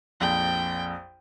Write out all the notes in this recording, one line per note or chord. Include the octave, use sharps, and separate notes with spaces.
A#1 F2 G5